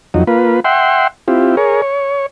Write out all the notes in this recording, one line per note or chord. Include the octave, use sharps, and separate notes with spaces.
F2 F#3 D#4
A#3 F4 B4
E5 F#5 G5 C6
C4 E4 F4 G4
G#4 A#4 C#5
C#5